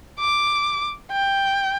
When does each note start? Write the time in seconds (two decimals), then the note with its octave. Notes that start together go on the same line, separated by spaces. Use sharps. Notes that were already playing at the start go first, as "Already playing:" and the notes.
0.19 D6
1.12 G5